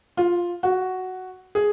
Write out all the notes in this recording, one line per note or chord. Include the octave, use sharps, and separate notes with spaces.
F4
F#4
G#4